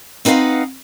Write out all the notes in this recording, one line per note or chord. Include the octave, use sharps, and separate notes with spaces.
C4 D#4 B4 C5 F5 F#5